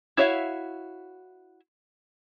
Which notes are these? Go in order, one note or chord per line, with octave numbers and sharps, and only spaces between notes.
E4 F#4 C#5 E5 F5